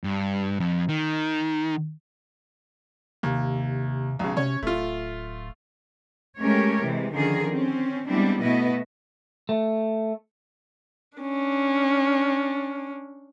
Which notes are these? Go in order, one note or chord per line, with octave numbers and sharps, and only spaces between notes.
G2
F2
D#3
D#2 C3
B1 C#3
C3 C#4 C#5
D1 A3 F4
G#3 A3 C#4 G4 A#4 C#5
C3 E3 G#3
D3 D#3 F3 C#4 G#4 A#4
C4 C#4
G3 G#3 B3 C4 D4 E4
B2 A3 B3 E4 B4 D#5
A3
C#4 D4